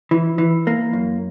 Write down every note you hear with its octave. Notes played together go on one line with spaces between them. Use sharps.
E3
E3
A#3
F#2